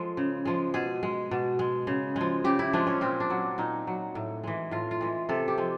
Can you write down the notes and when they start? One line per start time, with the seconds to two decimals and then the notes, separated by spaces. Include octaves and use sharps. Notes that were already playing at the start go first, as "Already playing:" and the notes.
Already playing: F3 G#3 A4
0.17 C#3
0.45 F3 G#3
0.74 B2 G#4
1.03 G#3
1.31 B2
1.59 G#3
1.87 C#3
2.16 F3 G#3
2.44 C#3 G4
2.59 E4
2.73 F3 G#3 D4
2.87 C#4
3.01 A#2 C4
3.20 D4
3.30 F#3
3.58 A#2 D#4
3.87 F#3
4.15 A2
4.44 E3 G#3
4.71 A2 F4
4.91 F4
5.01 E3 G#3
5.29 C3 A4
5.48 G4
5.58 F3 G#3